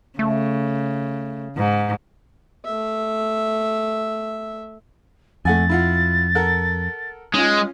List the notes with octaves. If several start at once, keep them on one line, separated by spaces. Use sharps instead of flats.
C#3 A3
G#2
A3 E5
F2 A3 F#5 G#5 A6
E4 F4 F#5
A4 A#4 F#5
G#3 C#4 F4